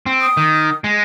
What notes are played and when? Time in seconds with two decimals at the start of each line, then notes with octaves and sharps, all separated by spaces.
0.06 C4
0.22 D#6
0.37 D#3
0.84 G#3